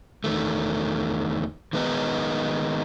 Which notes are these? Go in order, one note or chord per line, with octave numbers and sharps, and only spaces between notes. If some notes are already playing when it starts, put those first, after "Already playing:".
E2 D#3 A3
D#3 G#3 B3 D#4